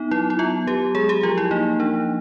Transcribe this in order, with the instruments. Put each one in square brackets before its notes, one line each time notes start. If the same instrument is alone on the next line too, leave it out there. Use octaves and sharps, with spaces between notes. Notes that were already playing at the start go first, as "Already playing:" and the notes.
Already playing: [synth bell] B3 D#4
F#3 E4
E4
B3 F4
F#3 G4
G#3 G#4
G4
F3 F4
E4
A#3 D#4
F3 D4